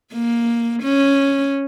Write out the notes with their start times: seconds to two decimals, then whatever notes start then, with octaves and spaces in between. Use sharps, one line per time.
0.13 A#3
0.83 C#4